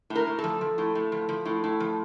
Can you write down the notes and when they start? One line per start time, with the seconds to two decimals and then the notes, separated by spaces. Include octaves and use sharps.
0.10 A2
0.15 A#4
0.27 A2
0.39 A4
0.44 F3
0.61 F3
0.78 A2
0.95 A2
1.12 F3
1.29 F3
1.45 A2
1.64 A2
1.80 F3